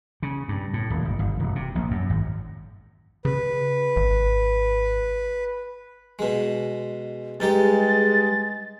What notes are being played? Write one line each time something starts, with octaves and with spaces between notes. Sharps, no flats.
C#3
G2
A2
D#1
G1
G1
E1
C3
A#1
F#2
G#1
C#3 B4
G#1
B2 G#3
G2 G#3 D#4 G4 A6